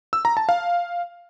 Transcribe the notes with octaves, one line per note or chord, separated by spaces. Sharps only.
E6
A#5
A5
F5